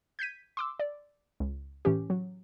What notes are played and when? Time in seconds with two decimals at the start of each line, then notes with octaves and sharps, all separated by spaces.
0.19 G6 G#6 B6 D#7
0.57 C6 D6 E6
0.80 D5
1.40 C#2
1.85 A2 E3 C#4 G4
2.10 F#3